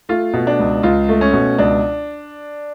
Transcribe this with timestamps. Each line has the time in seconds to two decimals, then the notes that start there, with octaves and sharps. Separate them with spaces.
0.09 A3 F4
0.33 B2
0.47 D4
0.59 C#2
0.83 C#2 F4
1.09 A3
1.21 C#4
1.33 B2
1.58 C#2 D4